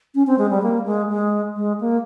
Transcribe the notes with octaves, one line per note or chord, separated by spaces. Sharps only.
C#4
C4
G#3
G3
A#3
G#3
G#3
G#3
A#3